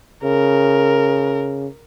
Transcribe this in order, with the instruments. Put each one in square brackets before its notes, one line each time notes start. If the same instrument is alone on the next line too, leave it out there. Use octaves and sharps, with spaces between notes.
[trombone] C#3 [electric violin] A#4